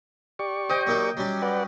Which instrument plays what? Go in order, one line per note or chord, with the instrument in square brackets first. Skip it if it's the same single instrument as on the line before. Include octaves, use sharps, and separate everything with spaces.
[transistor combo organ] G4 D5 C#6
[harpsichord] C5 [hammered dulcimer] D#5 G5
[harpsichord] F#3 A#3 D#4
F#3 G3 C#4
[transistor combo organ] B4 D5 F#5